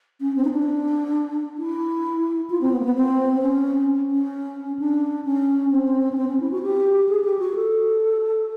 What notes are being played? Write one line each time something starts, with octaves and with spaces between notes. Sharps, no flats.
C#4
C4
D#4
D4
E4
F4
C4
B3
A#3
B3
C4
C#4
C#4
D4
C#4
C4
C#4
C4
C#4
E4
F#4
G4
G#4
G4
F#4
A4